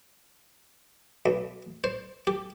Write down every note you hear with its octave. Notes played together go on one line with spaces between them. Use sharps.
B1
C5
G4